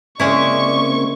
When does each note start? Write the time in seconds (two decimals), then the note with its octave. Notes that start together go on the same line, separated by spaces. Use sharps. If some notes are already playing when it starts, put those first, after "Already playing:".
0.20 C#3 G#3 A#3 C4 C#4 E4 D5 C#6